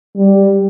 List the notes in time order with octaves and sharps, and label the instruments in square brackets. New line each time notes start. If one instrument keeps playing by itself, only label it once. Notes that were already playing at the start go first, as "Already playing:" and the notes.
[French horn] G3